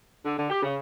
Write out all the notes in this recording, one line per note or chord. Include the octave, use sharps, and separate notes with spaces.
D3
D3
G4
C#3